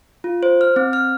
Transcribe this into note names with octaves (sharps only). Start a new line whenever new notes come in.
F4
C5
F6
C4
F6